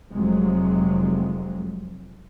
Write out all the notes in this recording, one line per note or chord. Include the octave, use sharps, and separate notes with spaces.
F1 F2 C3 F#3 G#3